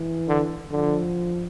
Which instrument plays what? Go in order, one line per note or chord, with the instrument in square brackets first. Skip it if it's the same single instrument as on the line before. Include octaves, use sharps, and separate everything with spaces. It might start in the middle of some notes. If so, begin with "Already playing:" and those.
Already playing: [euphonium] E3
[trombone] D3
[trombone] D3 [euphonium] F3